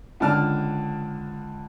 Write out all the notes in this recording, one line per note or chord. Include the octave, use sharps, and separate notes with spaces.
C#2 D3 D5 A5 F6